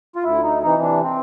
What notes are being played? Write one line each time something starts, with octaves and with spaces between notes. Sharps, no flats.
F4
D2 E4
D#4
C3 E3 D#4
D4
C4